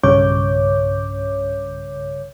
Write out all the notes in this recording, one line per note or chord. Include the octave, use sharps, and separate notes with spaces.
B1 G2 C#3 C#5 D6 G6